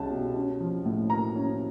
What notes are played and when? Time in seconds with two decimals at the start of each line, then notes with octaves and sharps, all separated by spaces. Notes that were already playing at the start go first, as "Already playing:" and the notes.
Already playing: C2 B2 G#3 C#4 A5
0.10 B2
0.35 C#4
0.60 F3
0.85 A2
1.10 A#3 A#5
1.36 C#4